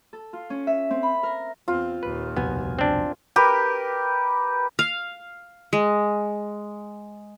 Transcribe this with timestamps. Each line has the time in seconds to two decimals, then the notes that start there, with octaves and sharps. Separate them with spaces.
0.13 A4
0.33 F4
0.50 C#4
0.67 E5
0.91 C4
1.03 B5
1.23 A#4
1.68 E2 C4 F4
2.03 D#2 A#2 B4
2.37 C2 F2 B2 B3 G#5
2.79 C4 D4
3.36 G4 A#4 B4
4.79 F5
5.73 G#3